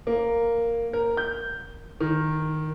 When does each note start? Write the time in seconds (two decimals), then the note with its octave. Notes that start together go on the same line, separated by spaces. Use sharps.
0.07 A#3
0.93 A#4
1.17 G6
2.00 D#3